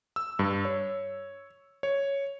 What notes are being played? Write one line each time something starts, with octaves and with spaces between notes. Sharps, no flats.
E6
G2
C#5
C#5